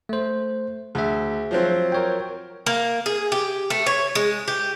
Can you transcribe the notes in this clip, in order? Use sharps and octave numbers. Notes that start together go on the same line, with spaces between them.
A3 C5
D2 G#4 E5
F3 F#3 C4
A#4 C#5 G5
A#3
G#4
G4
A3
C#5
G#3
G4